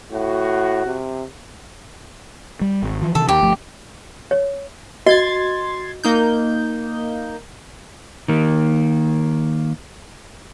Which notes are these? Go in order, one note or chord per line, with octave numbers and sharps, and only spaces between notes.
A2 F#4
C3
G3
G#1
E3 F3
C3 D#3 E3 A4
D#2 G4
G1 F3 A3
C#5
F#4 D#5 C6 G#6 A6
A#3 D#4 G6
D#3 A#3